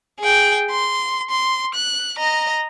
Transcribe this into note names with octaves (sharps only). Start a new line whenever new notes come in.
G#4 G5
C6
C6
F#6
D#5 A#5